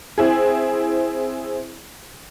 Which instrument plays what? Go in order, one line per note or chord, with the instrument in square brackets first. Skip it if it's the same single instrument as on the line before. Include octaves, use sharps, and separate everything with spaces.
[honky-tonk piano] C4 E4 G#4